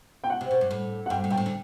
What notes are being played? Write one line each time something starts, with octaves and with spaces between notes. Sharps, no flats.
G5
F#5
C3
B2
G2
A2
F#5
G2 G5
A2
B2 G5
A2
D3